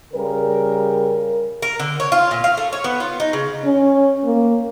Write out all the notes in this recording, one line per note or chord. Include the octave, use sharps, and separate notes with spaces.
C#3 G3 A#4
A#4
D3
C#5
F4
A#2
F5
A3
C#5
B3
F4
D#4
C#3
C#4
A#3